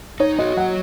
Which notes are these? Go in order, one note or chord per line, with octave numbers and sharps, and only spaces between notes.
D#4 C#5
F#4 D#5
F#3 F#5